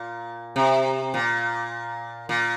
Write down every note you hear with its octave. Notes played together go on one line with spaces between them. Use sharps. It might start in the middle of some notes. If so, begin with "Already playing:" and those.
Already playing: A#2
C3
A#2
A#2